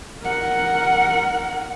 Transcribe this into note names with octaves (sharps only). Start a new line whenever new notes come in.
A#4 F#5